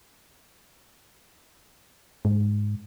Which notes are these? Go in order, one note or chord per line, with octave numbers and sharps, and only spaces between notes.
G#2